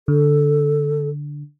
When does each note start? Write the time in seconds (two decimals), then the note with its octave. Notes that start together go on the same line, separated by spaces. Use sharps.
0.08 D3 A4